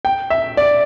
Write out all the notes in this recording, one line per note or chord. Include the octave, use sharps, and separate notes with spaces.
G5
E5
D5